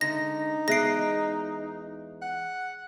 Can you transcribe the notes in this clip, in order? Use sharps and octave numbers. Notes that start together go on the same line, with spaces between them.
D3 G#3 D#4 A#6
E2 G#3 G#4 D#5 F#6 A#6 C7 D7
F#5